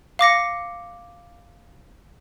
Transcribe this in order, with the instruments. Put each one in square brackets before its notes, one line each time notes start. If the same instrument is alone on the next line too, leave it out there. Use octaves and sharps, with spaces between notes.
[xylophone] F5 D6 A#6 C#7